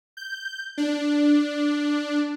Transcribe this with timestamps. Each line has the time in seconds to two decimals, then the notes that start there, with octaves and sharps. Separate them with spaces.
0.17 G6
0.78 D4